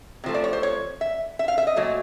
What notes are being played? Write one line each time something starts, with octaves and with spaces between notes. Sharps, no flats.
C3 F3 A3
D5
C#5
C5
C#5
E5
E5
F5
E5
D#5
A#2 F#3 A3